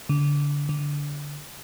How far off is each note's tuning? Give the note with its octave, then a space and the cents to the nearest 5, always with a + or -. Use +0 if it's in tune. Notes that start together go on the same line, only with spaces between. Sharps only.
D3 -25
D3 -15